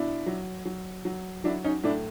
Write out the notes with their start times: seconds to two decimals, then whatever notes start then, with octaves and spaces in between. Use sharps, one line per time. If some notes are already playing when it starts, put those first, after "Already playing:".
Already playing: B2 D4 E4
0.27 F#3
0.65 F#3
1.05 F#3
1.44 F#3 D4 E4
1.64 C#4 D#4
1.83 A2 D4 E4